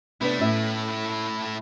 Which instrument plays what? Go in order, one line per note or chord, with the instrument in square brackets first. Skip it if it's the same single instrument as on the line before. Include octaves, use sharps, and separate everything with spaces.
[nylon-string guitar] C3 B3 D4 [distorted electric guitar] A3 E4
[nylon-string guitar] A2 C#4 E5